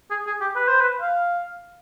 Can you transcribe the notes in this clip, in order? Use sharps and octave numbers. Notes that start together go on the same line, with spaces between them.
G#4
G#4
G4
B4
C5
B4
F5